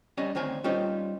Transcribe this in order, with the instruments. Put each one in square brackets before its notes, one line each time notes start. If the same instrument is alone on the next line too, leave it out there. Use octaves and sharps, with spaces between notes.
[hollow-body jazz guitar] G3 C#4 D#5
D2 D#3 C4 C#5 G#5
G3 C#4 D#4 F4 G4 C5